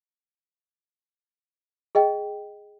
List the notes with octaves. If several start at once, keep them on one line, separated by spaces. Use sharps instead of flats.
G#4 D#5 G5